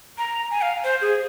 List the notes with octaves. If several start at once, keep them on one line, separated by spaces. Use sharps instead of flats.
A#5
G#5
F5
C5
G#4